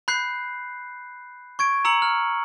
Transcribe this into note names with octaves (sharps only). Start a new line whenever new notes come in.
B5 F#6 G6 C7
C#6 G#6 D7
A#5 E6 C#7 F#7
F6